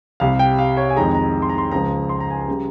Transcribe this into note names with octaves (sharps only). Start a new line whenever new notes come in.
C2 C3 G3 F5
G5
F5
C#5
G#5
F2 D#3 G#3 A#5
A#5
C6
A#5
C6
C#2 C#3 F3 G#3 A#5
C6
A#5
G#5
A#5
C#3 G3